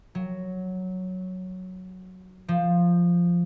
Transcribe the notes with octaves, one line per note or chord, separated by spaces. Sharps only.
F#3
F3